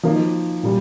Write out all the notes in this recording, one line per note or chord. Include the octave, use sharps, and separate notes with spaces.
F3 A#3 D#4
A#2 G3